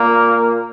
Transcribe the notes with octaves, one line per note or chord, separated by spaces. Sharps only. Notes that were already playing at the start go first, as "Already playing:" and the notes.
Already playing: A#2 A#3